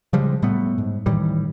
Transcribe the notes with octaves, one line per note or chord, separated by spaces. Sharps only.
C#3 F3 G3 G#3
A2 G3 A3 B3
G#2
A2 D#3 E3 G3